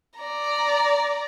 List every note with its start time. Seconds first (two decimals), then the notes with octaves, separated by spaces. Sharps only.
0.19 D5 A#5